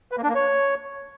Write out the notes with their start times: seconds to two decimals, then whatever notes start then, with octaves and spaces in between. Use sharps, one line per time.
0.12 B4
0.17 A#3
0.23 D4
0.29 A#3
0.35 C#5